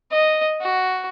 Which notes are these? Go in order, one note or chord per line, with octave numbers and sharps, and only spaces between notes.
D#5
F#4